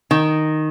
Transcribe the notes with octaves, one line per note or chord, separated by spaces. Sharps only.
D#3